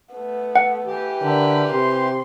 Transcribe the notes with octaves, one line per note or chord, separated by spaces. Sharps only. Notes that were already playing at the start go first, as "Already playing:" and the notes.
A3 B3
F#5
E3 G4
D3 A#4 B5
C3 C6